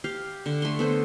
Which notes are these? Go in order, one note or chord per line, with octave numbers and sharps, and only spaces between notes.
G4 F5
D3
A3 C6
B3 A4 C5